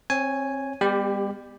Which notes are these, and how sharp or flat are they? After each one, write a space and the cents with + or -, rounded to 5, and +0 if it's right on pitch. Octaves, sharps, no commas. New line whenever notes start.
C4 +25 C#5 +0 G#5 +0
G3 +40 B3 +0 G4 +5